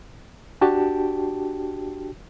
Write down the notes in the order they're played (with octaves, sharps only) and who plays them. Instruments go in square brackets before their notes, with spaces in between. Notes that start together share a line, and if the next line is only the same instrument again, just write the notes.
[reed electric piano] D4 F#4 G4 G5 A5